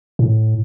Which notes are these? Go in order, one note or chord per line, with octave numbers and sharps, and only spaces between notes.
A2